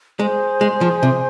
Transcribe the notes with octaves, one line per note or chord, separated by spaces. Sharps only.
G#3 G#4 C5 G#5 C6
G#3
F3
C3